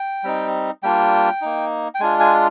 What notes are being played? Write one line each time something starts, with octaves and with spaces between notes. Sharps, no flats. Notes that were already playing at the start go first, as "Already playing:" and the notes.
Already playing: G5
G3 C4 D#4
G3 A#3 D4 F4 G5
A#3 D#4
G5
G#3 D4 F4 G#5
G#5